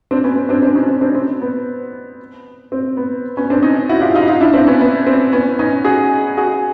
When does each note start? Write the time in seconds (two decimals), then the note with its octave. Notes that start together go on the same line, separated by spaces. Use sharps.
0.11 C4 D4
0.24 B3 C#4
0.36 C4
0.49 C4 D4
0.62 C4 D4
0.75 C#4 D#4
0.88 C4 D4
1.01 C4 D4
1.15 C4
1.42 B3
2.72 C4
2.97 B3
3.37 B3 C#4
3.50 C4 D4
3.63 C#4 D#4
3.89 E4 F#4
4.01 F4 G4
4.15 D#4 F4
4.28 D#4 F4
4.41 D4 E4
4.54 C4 D4
4.67 B3 C#4
4.81 B3
5.07 C4
5.32 B3 C#4
5.59 C#4 D#4
5.84 F#4 G#4
6.37 F#4 G#4